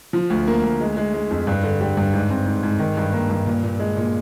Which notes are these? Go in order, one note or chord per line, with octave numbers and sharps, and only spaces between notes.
F3
D2
A#3
D2
G#3
G#3
G#3
F2
G2
D3
G3
G2
G#2
C4
G#2
G#2
D#3
G2
A#3
G2
A#2
A#2
G#3
A#2